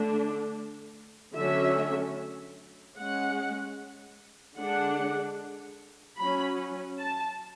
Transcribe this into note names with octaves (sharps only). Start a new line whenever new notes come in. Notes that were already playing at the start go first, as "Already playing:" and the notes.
Already playing: D3 A3 D4
D3 F#3 A3 C#4 E5
G#3 C#4 F#5
D3 G#3 D4 F#5
F#3 C#4 B5
A5